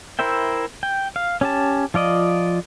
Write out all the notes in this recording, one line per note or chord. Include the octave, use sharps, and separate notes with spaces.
E4 A#4 C5 E5 G5
G5
F5
C#4 G4 A5
F3 F4 D5 D#5